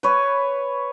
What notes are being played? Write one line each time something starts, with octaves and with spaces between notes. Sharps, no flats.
B4 C#5